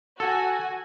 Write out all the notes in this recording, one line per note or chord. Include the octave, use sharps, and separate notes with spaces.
F#4 A4 G#5